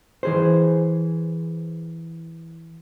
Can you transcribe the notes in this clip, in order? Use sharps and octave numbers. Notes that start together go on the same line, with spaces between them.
E3 G#4 C5